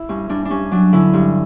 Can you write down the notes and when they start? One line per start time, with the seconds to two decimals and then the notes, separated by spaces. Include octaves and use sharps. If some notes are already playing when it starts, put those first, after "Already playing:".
Already playing: E4
0.09 G2 C#4
0.29 G2 D4
0.45 D4
0.50 G2 C#4
0.71 F#3 D4
0.92 D3 C#4 E4
1.14 G2